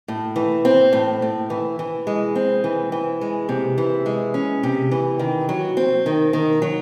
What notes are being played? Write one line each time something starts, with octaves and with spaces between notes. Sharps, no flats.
A2
E3
C4
A2
A2
E3
E3
G#3
C4
E3
E3
G#3
C3
E3
G#3
C#4
C3
E3
D#3
F#3
C4
D#3
D#3
F#3